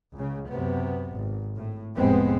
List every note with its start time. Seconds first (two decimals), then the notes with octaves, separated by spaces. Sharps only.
0.14 C#2 C#3
0.49 F#2 C3 B3
1.14 G#1
1.56 A2
1.96 F1 A2 C3 G#3 B3 C4